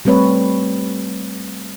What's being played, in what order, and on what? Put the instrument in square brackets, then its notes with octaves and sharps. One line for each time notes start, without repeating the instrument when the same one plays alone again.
[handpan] G3 A3 C4 B4 C#5